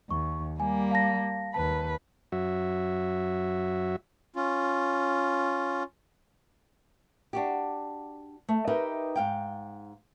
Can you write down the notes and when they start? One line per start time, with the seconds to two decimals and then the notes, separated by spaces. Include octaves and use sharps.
0.11 D#2 C#6
0.60 G3 A#3 G#5
0.91 F5 A5 A#6
1.54 D#2 B4 A5
2.32 F#2 F#3 F#4 E5
4.36 C#4 F4
7.33 D4 F#4 G4
8.49 A3
8.67 D#4 G4 A#4 B4 D#5 E5
9.16 G#2 F5 G5